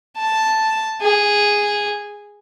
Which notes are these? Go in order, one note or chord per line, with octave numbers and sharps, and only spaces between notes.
A5
G#4